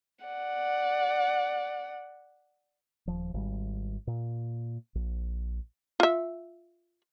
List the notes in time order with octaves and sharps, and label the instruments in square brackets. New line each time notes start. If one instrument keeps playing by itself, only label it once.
[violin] D5 F#5
[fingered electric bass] D#1 F3
G#1 G3
A#2
A#1
[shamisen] F4 E5